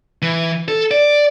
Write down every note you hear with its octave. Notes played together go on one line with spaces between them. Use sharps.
E3
A4
D5